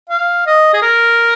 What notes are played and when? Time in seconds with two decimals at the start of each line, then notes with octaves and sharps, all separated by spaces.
0.10 F5
0.47 D#5
0.74 G#4
0.83 A#4